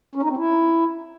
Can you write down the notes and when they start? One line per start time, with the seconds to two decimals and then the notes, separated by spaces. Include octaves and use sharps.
0.15 C#4
0.23 D#4
0.30 C4
0.37 E4